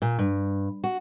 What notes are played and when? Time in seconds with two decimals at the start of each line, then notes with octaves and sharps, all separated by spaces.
0.02 A#2
0.18 G2
0.84 F#4